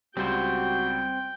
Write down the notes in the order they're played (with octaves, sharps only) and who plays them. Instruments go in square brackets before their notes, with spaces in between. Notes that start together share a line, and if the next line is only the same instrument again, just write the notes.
[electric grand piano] C#2 G3 [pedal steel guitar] C4 C5 [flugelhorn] F#4 [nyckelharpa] G5